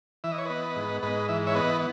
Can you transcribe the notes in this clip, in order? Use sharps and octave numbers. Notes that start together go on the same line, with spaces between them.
E3 E5
D#5
C#5
B3 B4 D#5
G#2
G#2 B4 D#5
E3 E5
C#5 E5
B3 B4 D#5